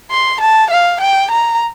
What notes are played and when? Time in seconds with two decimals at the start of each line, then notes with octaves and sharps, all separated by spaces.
0.11 C6
0.41 A5
0.71 F5
1.01 G5
1.31 A#5